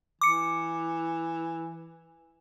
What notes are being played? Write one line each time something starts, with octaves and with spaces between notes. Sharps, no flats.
E3 D6 C#7